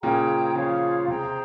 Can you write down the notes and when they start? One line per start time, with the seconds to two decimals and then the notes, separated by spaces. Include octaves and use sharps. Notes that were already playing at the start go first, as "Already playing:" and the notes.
0.03 A#2 C#3 G#4 C5 G5 A#5
0.55 C#3 F3 F4 G#4 C#5 F5
1.08 C3 G#4 C5 G5 A#5